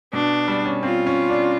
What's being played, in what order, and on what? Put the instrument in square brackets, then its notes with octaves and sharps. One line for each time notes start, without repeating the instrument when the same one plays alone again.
[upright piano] B2 [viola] D4
[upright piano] G3
C#4
[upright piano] C4 [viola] F4
[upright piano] C#4
D4